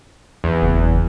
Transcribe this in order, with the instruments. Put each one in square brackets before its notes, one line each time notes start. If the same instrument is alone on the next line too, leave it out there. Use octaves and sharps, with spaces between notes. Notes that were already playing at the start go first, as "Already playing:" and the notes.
[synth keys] E2
[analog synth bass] F#1